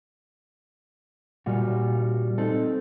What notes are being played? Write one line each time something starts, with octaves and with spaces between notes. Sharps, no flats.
A#2 G3 F4 F#4
C4 D#4 A4